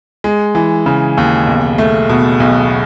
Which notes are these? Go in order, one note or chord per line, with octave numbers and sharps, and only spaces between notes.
G#3
E3
C#3
D#2
B1
A3
B2
B1